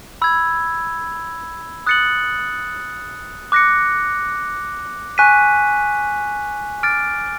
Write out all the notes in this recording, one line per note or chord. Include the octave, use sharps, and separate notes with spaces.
B5 E6 G#6
D#6 F#6 A6 C#7 F#7
D6 F#6 A#6 C#7
G#5 C#6 F#6 B6 D#7
D6 F6 A6 D7